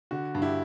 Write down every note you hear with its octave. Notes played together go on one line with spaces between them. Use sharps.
D3 F#4
G2
E4 G4